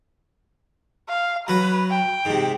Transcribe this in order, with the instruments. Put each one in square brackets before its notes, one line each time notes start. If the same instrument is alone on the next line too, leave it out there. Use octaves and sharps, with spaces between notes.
[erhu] F5
[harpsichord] F#3 F#4 [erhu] B4
[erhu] G5
[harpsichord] G#2 C3